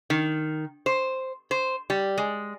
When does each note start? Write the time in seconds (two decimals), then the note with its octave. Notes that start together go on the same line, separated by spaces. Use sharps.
0.10 D#3
0.86 C5
1.51 C5
1.90 G3
2.18 G#3